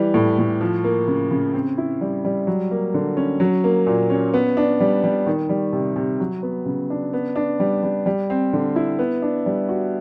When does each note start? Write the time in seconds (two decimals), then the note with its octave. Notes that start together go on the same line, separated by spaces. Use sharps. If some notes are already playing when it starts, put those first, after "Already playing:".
Already playing: E3 G3
0.14 A2
0.38 A2
0.61 F3
0.84 A#3
1.08 C#3
1.31 C#3
1.54 C4
1.78 E4
2.01 G3
2.25 G3
2.47 F#3
2.71 A#3
2.94 D3
3.17 C#4
3.40 F#3
3.64 A#3
3.87 A#2
4.10 C#4
4.34 B3
4.57 D4
4.80 G3
5.04 G3
5.27 D#3
5.49 G3
5.73 C3
5.96 C3
6.20 F#3
6.43 B3
6.66 C#3
6.90 D4
7.13 B3
7.36 D4
7.60 G3
7.83 G3
8.06 G3
8.30 C4
8.53 D3
8.76 E4
8.99 B3
9.22 D4
9.46 G3
9.69 F#4